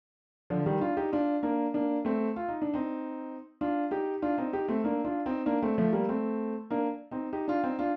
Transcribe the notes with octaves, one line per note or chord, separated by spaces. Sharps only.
D3 F3
D#3 G3
D4 F4
D#4 G4
D4 F4
A#3 D4
A#3 D4
A3 C4
F4
D#4
D4
C4 D#4
D4 F4
D#4 G4
D4 F4
C4 D#4
D#4 G4
A3 C4
A#3 D4
D4 F4
C4 D#4
A#3 D4
A3 C4
F3 A3
G3 A#3
A3 C4
A#3 D4
C4 D#4
D#4 G4
D4 F4
C4 D#4
D4 F4